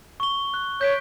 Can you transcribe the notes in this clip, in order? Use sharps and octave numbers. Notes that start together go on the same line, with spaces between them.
C#6 G7
F#6
C#5 G6 B6 D7